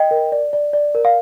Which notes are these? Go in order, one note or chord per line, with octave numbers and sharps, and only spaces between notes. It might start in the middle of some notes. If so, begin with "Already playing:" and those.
Already playing: D#5 G5
A#4
D5
D5
D5
A#4
F5